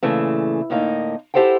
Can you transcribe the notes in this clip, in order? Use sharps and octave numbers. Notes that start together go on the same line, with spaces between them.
A#2 C#3 E3 A3
A2 D3 A#3 D#4
E4 G4 A4 C5 F#5 G5